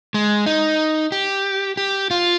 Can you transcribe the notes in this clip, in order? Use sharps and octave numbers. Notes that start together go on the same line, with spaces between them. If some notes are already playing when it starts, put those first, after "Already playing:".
G#3
D#4
G4
G4
F4